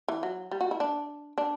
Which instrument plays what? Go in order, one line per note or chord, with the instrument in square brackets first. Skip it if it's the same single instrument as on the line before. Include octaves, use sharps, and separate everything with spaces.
[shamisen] E3
F#3
G3
F#4
E4
D4
D4